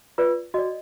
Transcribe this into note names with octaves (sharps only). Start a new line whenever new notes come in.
F4 B4 D5
F#4 D5 D#5